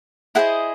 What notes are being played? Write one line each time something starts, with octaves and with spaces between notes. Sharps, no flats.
E4 G#4 C5 D#5 F#5